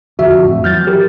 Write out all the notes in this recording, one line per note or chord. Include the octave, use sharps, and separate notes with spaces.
F2 D3 F3 F#4 E5
F2 A2
E3 F#3 F6 G6 A6
G4 A#4